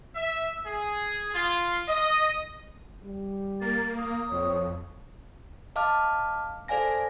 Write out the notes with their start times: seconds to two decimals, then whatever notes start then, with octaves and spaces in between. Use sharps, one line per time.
0.15 E5
0.66 G#4
1.35 F4
1.88 D#5
3.05 G3
3.61 A#3 A6
3.98 D#6
4.31 F2 C#5
5.76 D#5 F5 A5 D6 F6
6.68 A4 C5 D5 F5 G#5 A#6